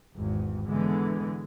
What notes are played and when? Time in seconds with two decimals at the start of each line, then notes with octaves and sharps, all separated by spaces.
0.15 G#1 E2
0.68 D3 E3 G#3 B3